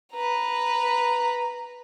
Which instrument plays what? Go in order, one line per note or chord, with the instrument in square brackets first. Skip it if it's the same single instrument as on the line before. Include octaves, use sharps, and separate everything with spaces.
[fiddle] B4 A#5